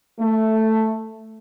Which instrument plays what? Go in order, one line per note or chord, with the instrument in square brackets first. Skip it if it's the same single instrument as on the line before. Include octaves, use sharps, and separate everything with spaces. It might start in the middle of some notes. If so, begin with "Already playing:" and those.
[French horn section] A3